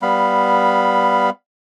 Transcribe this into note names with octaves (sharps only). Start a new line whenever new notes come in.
G3 B3 F5 B5